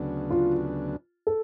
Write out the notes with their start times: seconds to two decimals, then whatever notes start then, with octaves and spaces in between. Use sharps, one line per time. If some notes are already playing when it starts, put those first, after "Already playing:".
Already playing: D2 C#3 F#3 B3 D4
0.31 F4
1.27 A4